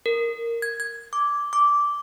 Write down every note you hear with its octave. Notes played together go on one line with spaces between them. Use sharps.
A#4
G#6
G#6
D6
D6